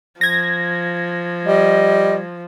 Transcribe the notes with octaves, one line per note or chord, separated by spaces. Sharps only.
F3 G#6 A#6
G3 D#5